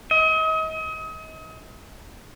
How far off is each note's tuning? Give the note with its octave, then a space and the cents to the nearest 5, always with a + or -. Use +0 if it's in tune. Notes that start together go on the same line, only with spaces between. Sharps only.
D#5 +35